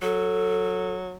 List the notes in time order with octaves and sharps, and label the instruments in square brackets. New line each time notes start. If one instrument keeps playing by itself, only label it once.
[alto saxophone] F#3 [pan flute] A4